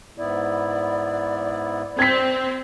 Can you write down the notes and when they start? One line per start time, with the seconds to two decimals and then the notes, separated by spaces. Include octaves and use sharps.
0.18 G#2 B3 E4 D5
1.99 C4 G#6 B6